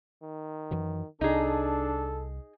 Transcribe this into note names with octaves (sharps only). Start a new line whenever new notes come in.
D#3
F#2 E3 F#3
C2 D4 D#4 G#4 A4